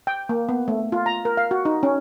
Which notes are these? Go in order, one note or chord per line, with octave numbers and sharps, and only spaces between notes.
G5
A#3
B3
A3
F4
A#5
A#4
F5
F#4
D#4
C#4